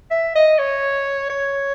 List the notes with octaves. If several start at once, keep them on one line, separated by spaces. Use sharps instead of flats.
E5
D#5
C#5
C#5